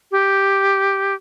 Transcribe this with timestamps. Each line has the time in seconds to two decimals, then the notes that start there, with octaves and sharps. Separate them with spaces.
0.12 G4